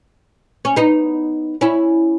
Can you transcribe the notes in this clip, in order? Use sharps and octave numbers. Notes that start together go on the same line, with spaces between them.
C#4
B3 D#4
C#4 E4